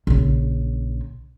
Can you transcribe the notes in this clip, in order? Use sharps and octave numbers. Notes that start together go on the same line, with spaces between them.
A#1 C#3